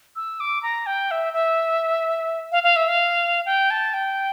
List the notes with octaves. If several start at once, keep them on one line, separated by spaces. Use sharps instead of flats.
E6
D6
A#5
G5
E5
E5
F5
F5
E5
F5
G5
A5
G5